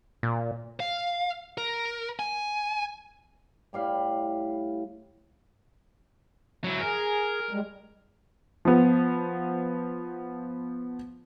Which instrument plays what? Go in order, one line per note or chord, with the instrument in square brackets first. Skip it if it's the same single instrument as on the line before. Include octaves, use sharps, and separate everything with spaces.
[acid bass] A#2
[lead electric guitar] F5
A#4
G#5
[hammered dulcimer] A2 G3 F5 B5
[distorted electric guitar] F#3 E4
[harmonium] G#4 [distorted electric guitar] A#4
[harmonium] G3 G#3
[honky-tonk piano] F3 B3